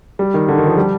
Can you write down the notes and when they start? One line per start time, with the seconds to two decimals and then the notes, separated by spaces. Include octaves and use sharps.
0.19 G3
0.34 D#3
0.48 D3
0.58 D#3
0.68 F3
0.77 G3